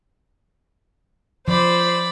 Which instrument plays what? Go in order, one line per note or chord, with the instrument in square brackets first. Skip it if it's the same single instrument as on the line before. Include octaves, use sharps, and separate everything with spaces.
[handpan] F3 [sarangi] C5 [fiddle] D5 B5